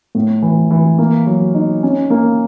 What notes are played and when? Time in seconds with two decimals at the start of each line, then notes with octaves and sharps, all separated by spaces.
0.15 A2
0.42 E3
0.71 E3
0.99 A#3
1.27 F#3
1.54 D#4
1.83 C#4
2.10 A#3